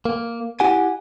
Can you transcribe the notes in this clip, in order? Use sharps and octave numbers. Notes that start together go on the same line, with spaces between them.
A#3
E4 G4 F#5 G#5